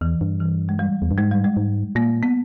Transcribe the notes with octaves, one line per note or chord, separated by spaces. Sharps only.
E2 E3
G2
E3
G#3
G3
E2
G2
G#2 G#3
G3
G#3
G#2
A#2 A#3
B3